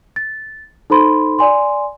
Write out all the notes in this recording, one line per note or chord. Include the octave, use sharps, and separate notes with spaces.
A6
D#4 A4 C5 B5 C6
D5 G#5 C6